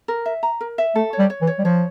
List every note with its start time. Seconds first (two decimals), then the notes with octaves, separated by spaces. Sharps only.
0.08 A#4
0.26 E5
0.43 A#5
0.61 A#4
0.78 E5
0.95 A3 A4
1.13 C#5
1.19 G3
1.30 C#5
1.42 E3
1.47 C#5
1.59 G3
1.64 F3 C#5